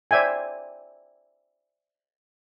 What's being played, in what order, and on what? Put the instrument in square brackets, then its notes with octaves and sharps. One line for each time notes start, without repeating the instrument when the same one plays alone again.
[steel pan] C5 D5 E5 G5 G#5